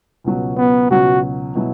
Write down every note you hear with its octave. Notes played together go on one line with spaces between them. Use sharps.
C#2 B2 F#3 C#4
B3
C#2 B2 F#3 C#4 F#4
B2 F#3 E4